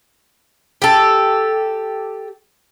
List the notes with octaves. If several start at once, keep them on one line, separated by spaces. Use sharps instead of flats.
G4 A4